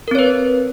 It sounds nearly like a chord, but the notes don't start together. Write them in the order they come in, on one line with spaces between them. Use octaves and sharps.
A#4 C4 C#5 B4